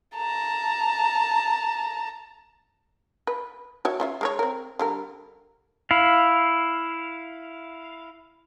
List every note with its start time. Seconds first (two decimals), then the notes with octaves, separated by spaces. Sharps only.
0.17 A5 A#5
3.27 B4
3.85 F#4 C#5 E5
4.00 C#4 F4 E5
4.21 G#3 A#4 C#5
4.39 C4 A#4
4.79 D3 G3 A#4
5.91 E4 F5